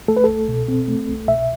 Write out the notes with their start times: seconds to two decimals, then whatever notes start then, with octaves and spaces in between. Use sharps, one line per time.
0.08 A3 A4
0.17 B4
0.24 C2 A4
0.48 B2
0.68 C4
0.88 A3
1.08 C2
1.28 B2 E5